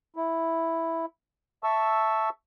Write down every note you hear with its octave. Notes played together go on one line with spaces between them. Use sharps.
E4
E5 A5 C#6 E6